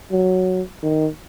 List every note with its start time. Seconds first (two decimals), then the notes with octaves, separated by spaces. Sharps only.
0.12 F#3
0.82 D#3